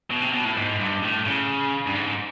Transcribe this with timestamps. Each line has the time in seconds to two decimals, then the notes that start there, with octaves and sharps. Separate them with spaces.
0.10 B2
0.22 C3
0.34 B2
0.45 A2
0.57 G#2
0.80 G2
1.03 A2
1.26 C#3
1.87 G2
1.95 G#2